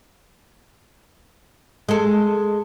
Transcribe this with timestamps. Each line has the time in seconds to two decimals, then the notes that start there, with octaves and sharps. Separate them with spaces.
1.89 G#3 A4